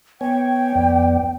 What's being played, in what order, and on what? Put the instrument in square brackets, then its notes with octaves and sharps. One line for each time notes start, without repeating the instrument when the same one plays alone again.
[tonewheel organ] B3 C#5 G#5 [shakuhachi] G5
[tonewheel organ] F2 B3 D5